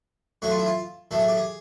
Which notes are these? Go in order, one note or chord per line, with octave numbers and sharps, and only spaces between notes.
A2 F#3 A3 F#4
F4
E4
F4
A2 F#3 A3 A4
G#4
G4
G#4